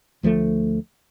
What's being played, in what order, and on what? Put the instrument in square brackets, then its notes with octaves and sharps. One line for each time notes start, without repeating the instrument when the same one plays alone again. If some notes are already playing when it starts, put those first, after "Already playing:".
[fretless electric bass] D2 F3 G#3 A3